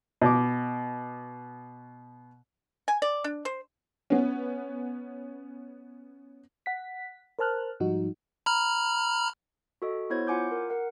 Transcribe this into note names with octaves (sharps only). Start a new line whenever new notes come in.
B2 D6
G#5
D5
D4
C5
B3 C#4
F#5 B6
A#4 C5 A5 F6 F#6
G#2 F3 G3 D#4 F#4
A#5 B5 F6
F#4 A4 D#5
B3 E4 C5 C#5 G#6
F4 F#5 G#5 D6 G6
A#4
A#4 F#5